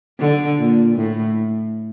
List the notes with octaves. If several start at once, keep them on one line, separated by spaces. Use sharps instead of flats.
D3
A#2
A2